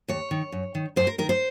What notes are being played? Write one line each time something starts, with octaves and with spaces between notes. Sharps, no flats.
D#2 C#5
D#3
F#2
D#3
F#2 C5
A#4
D#3 A#4
C5